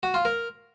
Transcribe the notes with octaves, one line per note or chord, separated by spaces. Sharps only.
F#4
F4
A#4